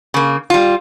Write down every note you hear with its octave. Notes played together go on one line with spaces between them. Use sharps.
C#3 A#3
G3 F4